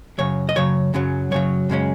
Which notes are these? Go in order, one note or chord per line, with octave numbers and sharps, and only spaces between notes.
F#2 C#3 F#3 C#5
D#5
F#2 C#3 F#3 C#5
F#2 C#3 F#3
F#2 C#3 F#3 C#5
F#2 C#3 G#3 C#4